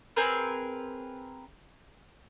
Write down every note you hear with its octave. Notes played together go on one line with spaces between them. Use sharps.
C4 G#4 A#4 B4